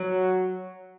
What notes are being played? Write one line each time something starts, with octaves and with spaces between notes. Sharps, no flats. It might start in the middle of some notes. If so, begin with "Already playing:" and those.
Already playing: F#3